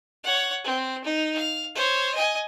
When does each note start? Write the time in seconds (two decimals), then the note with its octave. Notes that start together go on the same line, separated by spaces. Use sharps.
0.23 C#5 F#5
0.65 C4
1.04 D#4
1.36 F5
1.75 C5 C#5
2.14 D#5 G#5